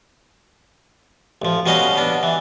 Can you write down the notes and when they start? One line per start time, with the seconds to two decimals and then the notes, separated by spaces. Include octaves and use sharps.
1.42 A1 F3
1.66 B2 G3 C#4 F#4 D#5 F5
1.97 B3 D4
2.23 E3